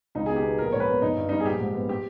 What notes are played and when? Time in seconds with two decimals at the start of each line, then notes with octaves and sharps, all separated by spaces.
0.15 C#2 D#4
0.26 B2 G#4
0.36 G4
0.43 B3
0.58 A#1 A#4
0.72 G#2 C#5
0.80 B4
0.88 B3
1.02 G1 D#4
1.16 G2
1.29 G3 D#4
1.40 G#4
1.45 A#1 G4
1.60 G#2
1.74 B3
1.89 G4